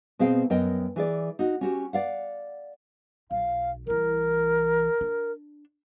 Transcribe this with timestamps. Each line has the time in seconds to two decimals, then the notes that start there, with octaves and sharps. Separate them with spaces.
0.19 B2 C4 G#4 F5 G5
0.50 F#2 B3 A#4 D#5 G5
0.96 E3 G#4 D5
1.39 D#4 F#4
1.61 C#4 F#4 G4
1.93 D5 F5 F#5
3.31 B1 F5
3.87 C2 E3 A#4
5.01 D4